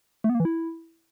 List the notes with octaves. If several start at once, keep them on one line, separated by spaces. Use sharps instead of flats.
A3
B3
A#3
E3
E4